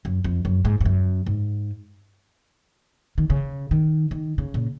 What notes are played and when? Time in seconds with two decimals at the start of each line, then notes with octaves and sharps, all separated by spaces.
0.05 F#2
0.24 F2
0.45 F#2
0.65 G#2
0.80 G#2
0.86 F#2
1.26 G#2
3.18 D#3
3.30 C#3
3.71 D#3
4.11 D#3
4.38 C#3
4.54 A#2